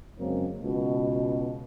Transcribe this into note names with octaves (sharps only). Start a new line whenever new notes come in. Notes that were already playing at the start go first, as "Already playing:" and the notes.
F#2 C#3 G#3 A#3 C4 C#4
C#2 B2